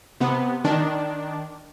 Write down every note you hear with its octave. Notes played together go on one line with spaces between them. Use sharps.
C3 B3
D#3 D4